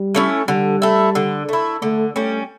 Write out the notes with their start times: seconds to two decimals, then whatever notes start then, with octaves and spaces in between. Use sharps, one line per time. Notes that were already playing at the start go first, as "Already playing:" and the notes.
Already playing: G3
0.15 A3 C#4 E4
0.48 D3 G3
0.82 A3 E4
1.15 D3
1.49 A3 E4
1.82 D3 A3
2.16 G3 A3 C#4